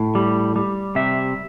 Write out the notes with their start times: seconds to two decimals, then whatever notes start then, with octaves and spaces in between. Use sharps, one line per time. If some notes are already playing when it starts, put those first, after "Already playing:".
Already playing: A2
0.15 G3
0.56 G3
0.95 C3 E5